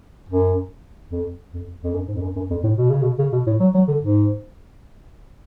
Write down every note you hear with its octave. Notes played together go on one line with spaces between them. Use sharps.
F#2
F2
F2
F2
F#2
G#2
F2
F#2
F#2
F2
A2
B2
C#3
B2
C#3
B2
A2
F#3
F#3
D3
G#2